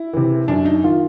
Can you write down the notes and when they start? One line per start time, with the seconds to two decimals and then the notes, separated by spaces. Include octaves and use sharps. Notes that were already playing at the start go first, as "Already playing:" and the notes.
Already playing: E4
0.13 C3 E3
0.48 F#2 D4
0.65 D#4
0.83 D#3 F4